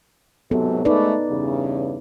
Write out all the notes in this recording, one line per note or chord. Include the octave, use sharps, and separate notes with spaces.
G#2 C3 F#3 B3 A4
G#2 A3 D#4 B4 D5
E2 G2 C#3